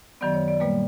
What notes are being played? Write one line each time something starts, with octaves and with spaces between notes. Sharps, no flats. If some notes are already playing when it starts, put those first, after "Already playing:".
F#2 D#3 F#3 B3 D5
C#5
D5
A#2 G3 A#3 B4